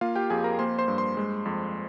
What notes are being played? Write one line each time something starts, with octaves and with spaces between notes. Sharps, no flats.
A#3 F4 F5
G4 G5
F2 G#4 G#5
A#4 A#5
A#3 C5 C6
C5 C6
G2
C5 C6
G#3
F2